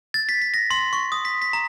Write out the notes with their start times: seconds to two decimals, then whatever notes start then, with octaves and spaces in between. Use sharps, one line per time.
0.14 A6
0.29 B6
0.42 B6
0.54 A#6
0.71 C6
0.93 C#6
1.12 D#6
1.25 B6
1.42 B6
1.53 A#5